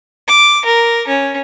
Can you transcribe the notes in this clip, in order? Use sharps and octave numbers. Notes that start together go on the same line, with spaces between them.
D6
A#4
C#4